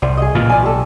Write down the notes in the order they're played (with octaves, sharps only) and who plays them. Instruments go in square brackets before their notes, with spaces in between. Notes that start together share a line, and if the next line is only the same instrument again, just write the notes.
[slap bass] C2 [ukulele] C5 D5
[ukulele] G#4 D#5
[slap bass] A#2 C#3 E3 [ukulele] F4
[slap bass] B1 [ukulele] D5 G#5
[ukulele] G4 A4